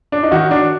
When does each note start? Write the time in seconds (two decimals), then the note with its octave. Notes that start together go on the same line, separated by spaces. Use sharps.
0.12 D4
0.23 D#4
0.31 D#3 F#4
0.51 D4